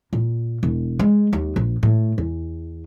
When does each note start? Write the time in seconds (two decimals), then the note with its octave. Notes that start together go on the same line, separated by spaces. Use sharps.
0.13 A#2
0.63 E1
0.99 G#3
1.33 D#2
1.56 A#1
1.83 A2
2.18 E2